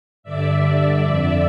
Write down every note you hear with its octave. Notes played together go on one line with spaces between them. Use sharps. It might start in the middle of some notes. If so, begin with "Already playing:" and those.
G2 D3 D5 E5
F2 D3